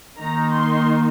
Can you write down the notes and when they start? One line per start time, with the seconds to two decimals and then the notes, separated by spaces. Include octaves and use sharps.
0.18 D#3 A#3 D#4 A#5
0.53 C6